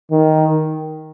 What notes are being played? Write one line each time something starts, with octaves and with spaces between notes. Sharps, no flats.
D#3